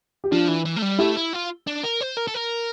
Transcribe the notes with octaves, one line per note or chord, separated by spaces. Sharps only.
G4
F3 D4 F4
E3
E3
A3
G3
A3 E4 G4
E4
F4
D4
A#4
C5
A#4
A4
A#4